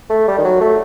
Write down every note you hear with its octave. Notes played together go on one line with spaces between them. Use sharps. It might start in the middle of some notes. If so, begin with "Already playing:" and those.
A3
G3
D#3
F#3
A3